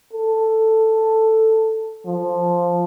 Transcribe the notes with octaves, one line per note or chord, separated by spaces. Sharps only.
A4
F3